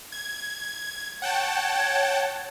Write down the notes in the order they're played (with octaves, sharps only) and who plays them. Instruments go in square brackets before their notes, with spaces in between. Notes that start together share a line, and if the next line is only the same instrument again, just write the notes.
[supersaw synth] G#6
[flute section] C#5 [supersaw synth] F#5 G5 A5